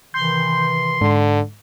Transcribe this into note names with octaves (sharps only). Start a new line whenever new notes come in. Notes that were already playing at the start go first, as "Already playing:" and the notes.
C3 D#3 E3 C6 G6
G#2 D3